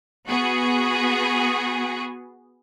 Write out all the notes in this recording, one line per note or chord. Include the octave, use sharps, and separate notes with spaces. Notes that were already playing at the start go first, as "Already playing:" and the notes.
B3 F#4 G#4